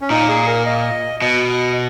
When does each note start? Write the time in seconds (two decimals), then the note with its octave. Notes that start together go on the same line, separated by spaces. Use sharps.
0.01 C#4
0.10 A#2 D#4
0.29 G#4
0.47 A#4
0.66 D#5
1.22 B2 D#5